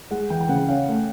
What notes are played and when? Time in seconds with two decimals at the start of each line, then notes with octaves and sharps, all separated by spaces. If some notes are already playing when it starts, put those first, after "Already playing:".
0.11 G#3 F#5
0.30 E3 G5
0.41 G5
0.49 C#3 F#5
0.69 C#4 F5
0.88 A3